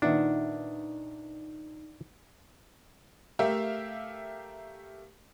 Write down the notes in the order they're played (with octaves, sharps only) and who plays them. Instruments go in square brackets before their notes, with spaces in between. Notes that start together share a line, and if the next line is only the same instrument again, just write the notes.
[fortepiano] A#2 D#3 [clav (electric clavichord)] D4 [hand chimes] D#4 [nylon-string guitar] B4 E5 F#5
[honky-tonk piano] A3 G4 A#4 E5 F5